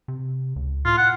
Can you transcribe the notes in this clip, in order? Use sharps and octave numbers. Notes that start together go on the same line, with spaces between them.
C3
C#2
A2 F4
F#5